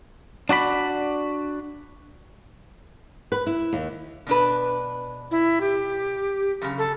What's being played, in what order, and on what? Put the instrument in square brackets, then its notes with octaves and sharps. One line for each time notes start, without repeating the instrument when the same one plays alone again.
[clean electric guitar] D4 F#4 D5 B5
[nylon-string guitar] B4
E4
D#2
[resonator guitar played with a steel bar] B2 D4 B4
[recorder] E4
G4
[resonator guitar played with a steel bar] F#2 C#3
[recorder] A4